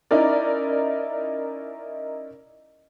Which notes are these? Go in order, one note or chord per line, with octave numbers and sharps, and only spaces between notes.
C#4 D#4 E4 A#4 D5